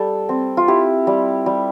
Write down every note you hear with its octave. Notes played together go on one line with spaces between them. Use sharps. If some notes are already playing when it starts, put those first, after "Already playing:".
Already playing: G3 A4
C4
F4
E4 G4
G3
G3